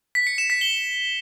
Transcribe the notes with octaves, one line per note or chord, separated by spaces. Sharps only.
B6
C#7
E7
B6
G7